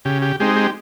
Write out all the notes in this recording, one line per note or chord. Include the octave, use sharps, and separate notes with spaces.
C#3 G4
G4
G#3 C4 D#4 G4
G4